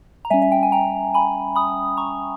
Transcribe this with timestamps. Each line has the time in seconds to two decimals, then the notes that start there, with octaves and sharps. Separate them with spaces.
0.25 A#5
0.30 G3 C#4 E5 G#5
0.42 E5
0.52 G5
0.63 G#5
0.72 G5 A#5
1.14 G#5 B5
1.55 B5 D#6
1.97 A#5 C#6